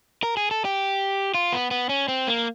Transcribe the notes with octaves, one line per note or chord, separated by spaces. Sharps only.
A#4
G#4
A4
G4
F4
B3
B3
C#4
C4
A#3